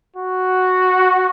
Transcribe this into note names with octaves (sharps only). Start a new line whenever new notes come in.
F#4